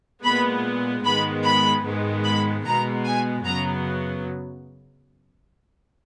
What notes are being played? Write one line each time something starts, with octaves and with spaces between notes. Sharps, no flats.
A#2 G#3 B3 B5
G#2 D#3 G#3 B3 B5
B5
G#2 D#3 G#3 B3
B5
B2 G#3 B3 A#5
G#5
F#2 C#3 F#3 B3 A#5